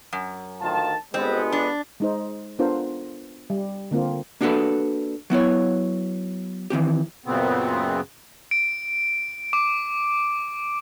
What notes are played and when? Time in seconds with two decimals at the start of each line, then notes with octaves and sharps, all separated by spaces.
0.13 F#2
0.62 D2 D#3 F4 A5
1.14 G1 G#3 B3 C4
1.52 D4
2.00 G#3 D#4 C5
2.59 B3 D4 F4 A4 A#4 C5
3.50 G3
3.91 D3 A#3 C4 F4
4.41 A#3 D4 F#4 G4 A4 B4
5.30 F#3 B3 E4 C#5
6.70 D#3 E3 C4 G4
7.26 F#2 A#2 C#3 B3 C4
8.51 D7
9.53 D6